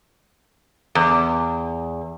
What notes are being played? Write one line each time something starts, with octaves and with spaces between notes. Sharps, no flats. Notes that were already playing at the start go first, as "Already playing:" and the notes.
E2